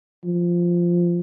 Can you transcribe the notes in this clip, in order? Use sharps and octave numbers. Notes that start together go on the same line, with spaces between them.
F3